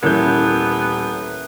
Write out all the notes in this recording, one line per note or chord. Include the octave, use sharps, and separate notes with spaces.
D#1 E3 B3 C#4 A#4 G6